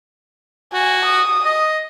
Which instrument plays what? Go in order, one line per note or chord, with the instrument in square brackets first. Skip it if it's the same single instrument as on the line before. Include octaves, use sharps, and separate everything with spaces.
[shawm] F#4 [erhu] G#5
[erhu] D#6
[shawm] D#5